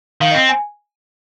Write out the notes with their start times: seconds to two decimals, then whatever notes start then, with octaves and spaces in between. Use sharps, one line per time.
0.21 D#3 F5
0.31 D#5
0.35 C4
0.49 G#5